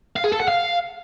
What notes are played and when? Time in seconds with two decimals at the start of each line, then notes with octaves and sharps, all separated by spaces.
0.16 F5
0.24 G#4
0.32 A4
0.40 F#5
0.48 F5